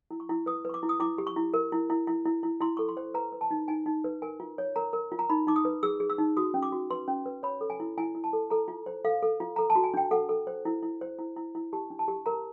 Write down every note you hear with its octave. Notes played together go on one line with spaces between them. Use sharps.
E4
C#6
E4
B4 D#6
B4 C#6
D6
E4
D#6
E4 D6
G4
C#6
E4
A#4
E4
E4
E4
E4
E4
E4 C6
A4 C#6
C6
C5
B4 A#5
B4
A5
D#4
D#4 G#5
D#4
B4
A#4 G#5
F4
C#5
A#4 A#5
A#4
F4
A#5
D#4 B5
D#4 D6
D#6
B4
G#4 E6
G#4
E6
D#4
F#4 D#6
C#4
D6
F#4
B4 C6
C#4
B4
C#5 B5
A4
G#5
E4
E4 G#5
E4
A5
A4
A4 A#5
F4
C5
A4 F5
A4
F4
A4 A#5
A5
F#4
G#5
D4 G5
A4 F#5
A4
C5
E4
E4
C5
E4
E4
E4
G4 A5
D4
A5
G4
A#4 A#5